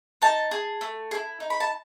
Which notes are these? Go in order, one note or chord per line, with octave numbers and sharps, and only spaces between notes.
D#4 A5
G#4
A3
G#4
E4
D#4
B5
A5